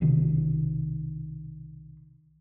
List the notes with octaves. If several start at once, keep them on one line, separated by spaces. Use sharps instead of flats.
B1 C3 D#3